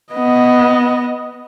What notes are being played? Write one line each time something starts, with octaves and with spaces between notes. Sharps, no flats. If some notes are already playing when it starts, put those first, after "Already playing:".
B3 D#5